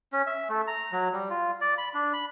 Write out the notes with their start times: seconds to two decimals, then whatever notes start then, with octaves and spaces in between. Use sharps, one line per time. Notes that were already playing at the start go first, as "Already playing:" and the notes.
0.13 C#4
0.27 E5
0.49 A3
0.67 A#5
0.92 F#3
1.13 G3
1.30 F4
1.61 D5
1.78 B5
1.94 D4
2.13 B5